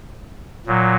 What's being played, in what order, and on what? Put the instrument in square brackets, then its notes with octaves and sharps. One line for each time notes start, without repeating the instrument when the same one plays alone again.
[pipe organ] A#2 F#3